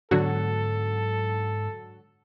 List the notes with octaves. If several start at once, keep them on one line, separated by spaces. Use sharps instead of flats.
G#2 D3 F#3 B3 F#4 A4